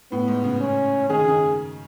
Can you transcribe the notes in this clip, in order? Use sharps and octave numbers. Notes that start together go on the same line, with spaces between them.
A2 B3
G#2
C#3
C#4
D#3 G#4
C#3
D#3